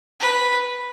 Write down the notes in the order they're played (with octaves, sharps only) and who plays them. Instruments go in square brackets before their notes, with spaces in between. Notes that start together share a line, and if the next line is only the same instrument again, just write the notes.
[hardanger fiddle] B4